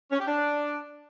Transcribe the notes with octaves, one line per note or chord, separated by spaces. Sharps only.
C#4
G4
D4